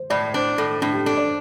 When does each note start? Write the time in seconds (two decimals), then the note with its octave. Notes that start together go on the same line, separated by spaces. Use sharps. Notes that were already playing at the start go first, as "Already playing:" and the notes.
Already playing: C5
0.10 A2 D5
0.34 D4 C5
0.58 A2 A4
0.81 A2 D4
0.93 G4
1.06 D4 A4
1.17 D5